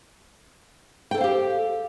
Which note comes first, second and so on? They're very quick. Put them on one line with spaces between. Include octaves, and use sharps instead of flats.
G5 A4 C5 F5 G4